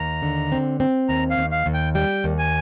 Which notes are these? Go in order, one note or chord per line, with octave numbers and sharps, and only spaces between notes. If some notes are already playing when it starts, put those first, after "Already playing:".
Already playing: D#2 A#5
D3
C4
C4
D#2 A#5
F5
D#2
F5
D#2
G5
G3 G5
D#2
G#5